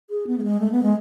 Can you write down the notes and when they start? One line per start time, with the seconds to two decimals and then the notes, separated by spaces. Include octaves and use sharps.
0.10 G#4
0.27 B3
0.38 A3
0.44 G#3
0.60 A3
0.72 B3
0.83 G#3